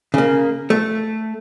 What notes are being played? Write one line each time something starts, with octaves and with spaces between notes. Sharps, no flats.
C#3 A#3
A3